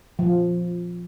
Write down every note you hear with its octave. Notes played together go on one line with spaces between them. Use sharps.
F3